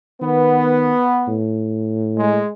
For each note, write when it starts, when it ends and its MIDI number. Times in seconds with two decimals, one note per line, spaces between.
0.22 0.92 51
0.22 1.40 59
1.28 2.41 45
2.18 2.51 56